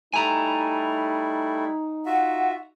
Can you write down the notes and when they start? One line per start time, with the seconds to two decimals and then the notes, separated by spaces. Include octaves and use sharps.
0.14 G3 A3 D#4 E4 G#5 A#5
2.06 F4 F#4 E5 F#5